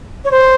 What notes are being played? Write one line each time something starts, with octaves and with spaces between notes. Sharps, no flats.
C#5
C5